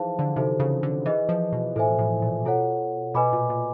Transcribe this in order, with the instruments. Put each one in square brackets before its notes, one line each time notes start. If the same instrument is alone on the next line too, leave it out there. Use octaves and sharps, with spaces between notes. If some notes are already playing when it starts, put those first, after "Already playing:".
Already playing: [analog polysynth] E3 F3 [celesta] D#4 G#4 C5 F5 A5
[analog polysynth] D3
[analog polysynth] C3 [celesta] D#4 F#4 A4 C5
[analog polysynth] C#3
D3
[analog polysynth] E3 [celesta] G#4 B4 D#5
[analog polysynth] F3
B2
[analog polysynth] A2 [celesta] A4 C5 E5 G#5
[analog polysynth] A2
A#2
[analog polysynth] B2 [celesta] F4 A4 C#5 F#5
[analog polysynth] B2 [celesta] B4 D#5 G#5 B5 D6
[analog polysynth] A#2
A#2